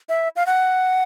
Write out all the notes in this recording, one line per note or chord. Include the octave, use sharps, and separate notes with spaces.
E5
F5
F#5